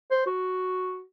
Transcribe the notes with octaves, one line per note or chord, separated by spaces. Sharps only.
C5
F#4